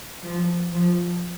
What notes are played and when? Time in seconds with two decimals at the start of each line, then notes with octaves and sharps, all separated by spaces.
0.23 F3
0.73 F3